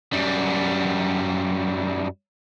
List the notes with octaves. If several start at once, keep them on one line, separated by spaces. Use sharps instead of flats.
F#2 G3